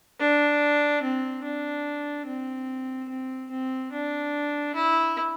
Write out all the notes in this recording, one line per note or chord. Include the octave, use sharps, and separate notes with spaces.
D4
C4
D4
C4
C4
C4
D4
E4